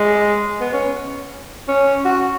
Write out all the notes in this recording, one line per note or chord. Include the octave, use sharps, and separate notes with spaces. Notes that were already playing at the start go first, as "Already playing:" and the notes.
Already playing: G#3
B3
C#4
C#4
F#4